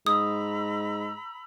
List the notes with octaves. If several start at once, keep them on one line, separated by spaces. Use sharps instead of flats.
G#2 A#5 B5 D#6 E6